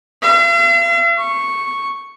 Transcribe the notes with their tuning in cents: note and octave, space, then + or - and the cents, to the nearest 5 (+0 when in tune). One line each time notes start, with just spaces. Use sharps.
F5 -45
C#6 -5